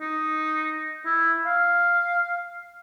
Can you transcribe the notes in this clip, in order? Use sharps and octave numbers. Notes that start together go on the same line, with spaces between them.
D#4
E4
F5